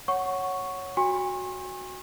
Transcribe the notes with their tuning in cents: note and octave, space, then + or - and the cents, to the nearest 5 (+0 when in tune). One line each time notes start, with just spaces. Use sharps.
C#5 +0 F#5 +0 C#6 +0
F#4 -5 G#5 -40 C#6 -45